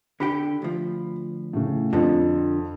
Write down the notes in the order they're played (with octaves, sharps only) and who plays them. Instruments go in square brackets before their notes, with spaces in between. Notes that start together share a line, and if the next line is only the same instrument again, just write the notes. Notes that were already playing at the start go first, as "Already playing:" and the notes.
[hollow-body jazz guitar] D3 G4 G5 [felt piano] B5
[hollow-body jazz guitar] D2 F3
[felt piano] A2 C#3
[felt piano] F2 [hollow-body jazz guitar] D3 F3